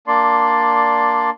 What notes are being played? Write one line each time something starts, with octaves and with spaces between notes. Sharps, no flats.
A#3 D4 D5 C6